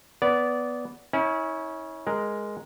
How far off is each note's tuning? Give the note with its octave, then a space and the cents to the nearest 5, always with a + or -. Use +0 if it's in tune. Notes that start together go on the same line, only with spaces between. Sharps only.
B3 +0 D5 -20
C#4 +0 E4 -40
G#3 +0 A#4 +5